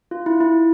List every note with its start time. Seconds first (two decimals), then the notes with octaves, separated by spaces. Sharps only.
0.11 F4
0.26 E4
0.41 E4